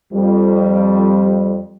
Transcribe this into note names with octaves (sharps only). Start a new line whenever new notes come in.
F2 G3